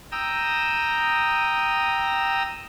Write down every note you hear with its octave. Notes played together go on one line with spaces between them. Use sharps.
G5 A#5 D#6 E6